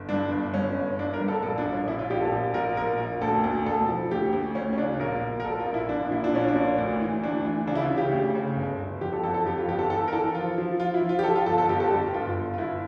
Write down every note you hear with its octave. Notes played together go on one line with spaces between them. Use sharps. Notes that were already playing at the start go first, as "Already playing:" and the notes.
Already playing: G1
G2 D4
G1
G2 C#4
G1
G2 D4
A#4
G2
A4
A#1 A4
D4
A#1
C#4
A#1 E4
F4
A#1 G4
A4
A#1 G4
A#1 A#4
A#1 A#4
A#1
D2 A4
D2
E1 A4
F3
D2 G4
D2
D2 C#4
C#4
C#3 D4
A#1 A#4
A#1
A#4
A#1 A4
F4
A#1
E4
A#1 D4
A#2 E4
D4
A#1 C#4
D4
A#1
D2
E3
D2 D4
E3
C#3 D4
E4
F4
C#3
G4
D2
C#3
G1
G1
F2 G4
A4
F2 A4
A4
F2 G4
F4
G1 G4
A4
E3 A4
A#4
E3 A4
F3 F4
F3
F3 F4
E4
F3
F4
G4
F3 A4
F4
G1 A4
A4
G1 G4
A4
G1 G4
G1 F4
G1
F4
G1 E4